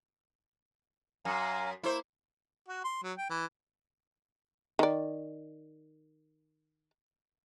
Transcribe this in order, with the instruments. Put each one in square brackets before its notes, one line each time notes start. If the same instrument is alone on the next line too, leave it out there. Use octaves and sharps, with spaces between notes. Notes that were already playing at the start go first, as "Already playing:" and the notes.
[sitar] F#2 [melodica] F5 G#5 A#5
[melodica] A#3 [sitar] E4 C5
[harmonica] F#4
C6
F#3
G5
E3
[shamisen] D#3 D5